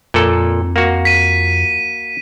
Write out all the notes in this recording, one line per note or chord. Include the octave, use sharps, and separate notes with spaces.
F2 A#2 A4
A#3 F#4
B6 D#7